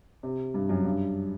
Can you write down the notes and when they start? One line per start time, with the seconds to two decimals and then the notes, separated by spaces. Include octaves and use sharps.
0.23 C3
0.54 G2
0.69 F#2
0.84 G2